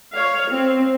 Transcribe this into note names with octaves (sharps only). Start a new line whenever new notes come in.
C#5 F5
C4